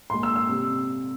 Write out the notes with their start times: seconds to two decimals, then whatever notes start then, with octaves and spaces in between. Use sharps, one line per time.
0.10 A#2 G#3 C6
0.23 E6
0.36 E6
0.49 C3 G3